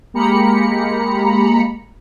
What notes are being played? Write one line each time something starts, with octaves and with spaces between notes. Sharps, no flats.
G#3 A#3 G4 A#5 B5 C#7